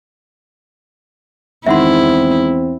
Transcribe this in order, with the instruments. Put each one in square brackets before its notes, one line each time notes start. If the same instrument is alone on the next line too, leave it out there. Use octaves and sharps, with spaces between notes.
[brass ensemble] E2 C4 [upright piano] D#3 G#3 [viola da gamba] E4 [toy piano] E5 F#5 C6